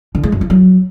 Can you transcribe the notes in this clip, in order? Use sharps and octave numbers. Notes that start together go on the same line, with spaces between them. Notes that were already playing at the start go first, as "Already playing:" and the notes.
D3
G#3
F#2
F3
F#3